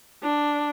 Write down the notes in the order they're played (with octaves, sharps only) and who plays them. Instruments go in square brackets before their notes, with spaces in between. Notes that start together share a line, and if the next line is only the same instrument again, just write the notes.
[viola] D4